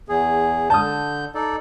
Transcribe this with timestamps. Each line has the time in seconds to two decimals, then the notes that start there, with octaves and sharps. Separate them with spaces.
0.09 E2 G#4
0.70 D3 A5 D#6 G6
1.35 D#4 A4 D5